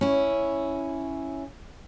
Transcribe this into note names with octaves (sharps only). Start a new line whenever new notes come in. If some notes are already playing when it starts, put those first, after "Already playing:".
C#4 E4